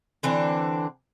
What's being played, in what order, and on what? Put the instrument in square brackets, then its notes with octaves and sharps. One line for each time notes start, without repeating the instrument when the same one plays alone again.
[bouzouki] D3 E3 C4 D4